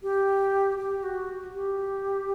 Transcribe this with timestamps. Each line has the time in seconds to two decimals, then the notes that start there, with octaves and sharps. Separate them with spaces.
0.03 G4
0.78 G4
1.03 F#4
1.54 G4